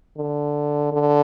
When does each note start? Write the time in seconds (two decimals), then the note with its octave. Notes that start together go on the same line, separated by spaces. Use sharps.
0.17 D3
0.92 D3